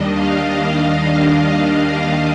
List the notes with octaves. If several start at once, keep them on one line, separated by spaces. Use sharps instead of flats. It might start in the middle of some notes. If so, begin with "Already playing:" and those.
Already playing: D#2 D#3 G3 D4 D#5
F5